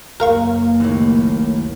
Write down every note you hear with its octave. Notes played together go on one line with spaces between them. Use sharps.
F#1 C#2 A#3 A#4 F5 C#6
D#2 A2